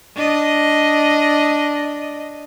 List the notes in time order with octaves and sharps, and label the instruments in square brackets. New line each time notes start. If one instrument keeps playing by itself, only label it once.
[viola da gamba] D4 D#5